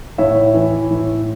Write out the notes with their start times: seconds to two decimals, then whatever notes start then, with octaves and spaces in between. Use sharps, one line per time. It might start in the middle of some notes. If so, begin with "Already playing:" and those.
0.18 A2 C#5 E5
0.54 E3
0.90 A2